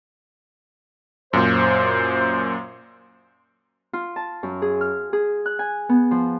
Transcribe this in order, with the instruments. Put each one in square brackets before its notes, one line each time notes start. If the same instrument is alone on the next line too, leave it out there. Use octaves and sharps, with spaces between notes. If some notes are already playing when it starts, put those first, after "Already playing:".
[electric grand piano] F#2 A#2 [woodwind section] C5
[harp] F4
A5
F#2
G#4
F6
G#4
F#6
G#5
B3
F3